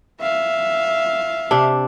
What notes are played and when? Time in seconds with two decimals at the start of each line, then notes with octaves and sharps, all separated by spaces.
0.20 E5 F5
1.51 C3 D4